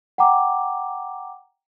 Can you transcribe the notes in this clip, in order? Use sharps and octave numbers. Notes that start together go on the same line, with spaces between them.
F#5 G5 A#5 D6